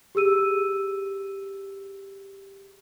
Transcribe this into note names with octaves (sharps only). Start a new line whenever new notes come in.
G4 G#4 E6 D#7